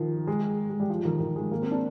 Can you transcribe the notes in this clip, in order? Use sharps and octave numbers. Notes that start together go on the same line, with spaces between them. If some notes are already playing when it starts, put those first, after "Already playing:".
Already playing: D#3 F3
G#3
G#3
G3
F3
D#3
D#3
G#3
A#3
C4
D4